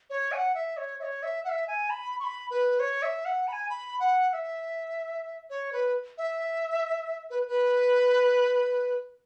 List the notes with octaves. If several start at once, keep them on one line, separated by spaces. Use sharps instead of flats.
C#5
G#5
F#5
E5
C#5
E5
C#5
E5
F#5
E5
G#5
B5
C#6
B5
B4
C#5
E5
F#5
B5
G#5
B5
F#5
F#5
E5
C#5
B4
E5
B4
B4